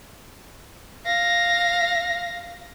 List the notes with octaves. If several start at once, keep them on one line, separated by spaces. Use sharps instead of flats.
F5 A#6